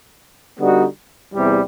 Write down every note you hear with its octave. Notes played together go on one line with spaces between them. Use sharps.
D3 G3 B3 D#4 F#4
E2 C3 E3 G3